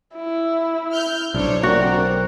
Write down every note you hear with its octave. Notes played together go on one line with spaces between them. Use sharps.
E4
F6 G6
B1 D4 C5 C#5
C4 F#4 A#4 D5